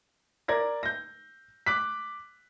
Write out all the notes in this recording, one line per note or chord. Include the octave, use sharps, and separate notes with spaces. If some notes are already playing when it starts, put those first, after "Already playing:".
A#4 D5 G#6 A#6
G6 A#6
D6 F#6 B6